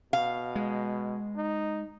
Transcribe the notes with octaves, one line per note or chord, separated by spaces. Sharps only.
B2 F5
G#3
D#4